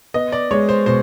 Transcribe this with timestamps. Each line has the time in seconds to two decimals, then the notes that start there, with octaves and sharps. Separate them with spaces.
0.14 B3 D#5
0.32 D5
0.51 G#3 C#5
0.69 C5
0.86 B2 C5